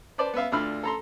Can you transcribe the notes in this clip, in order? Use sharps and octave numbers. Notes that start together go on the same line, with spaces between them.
B4 C5 D5 A5
B3 B4 E5 F5
D2 D4 F4 F5 B5 F6
A4 A#5 C6